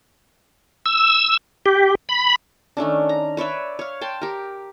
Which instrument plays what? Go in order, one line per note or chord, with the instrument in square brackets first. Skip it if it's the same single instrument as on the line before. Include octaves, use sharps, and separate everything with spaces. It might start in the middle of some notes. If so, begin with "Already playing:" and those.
[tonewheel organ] E6
G4
B5
[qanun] D#3 A3 C#4 D4
A#5
B4 C#5 D5 E5
C#5 F5
G5 A5 C6
G4 A#4